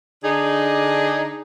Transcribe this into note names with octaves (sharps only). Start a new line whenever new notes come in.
D3 D4 D#4 G#4